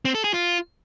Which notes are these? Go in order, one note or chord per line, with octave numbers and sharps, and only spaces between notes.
C4
A4
G#4
F4